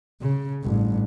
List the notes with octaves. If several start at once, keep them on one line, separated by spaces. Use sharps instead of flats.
C#3
A1 G2